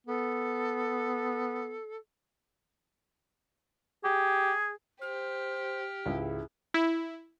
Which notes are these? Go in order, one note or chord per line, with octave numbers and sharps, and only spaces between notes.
B3 A4
G4 G#4
G4 C5 F6
C#2 G#2 E4
E4